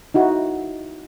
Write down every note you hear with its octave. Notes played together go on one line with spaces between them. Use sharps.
D#4 E4 F#4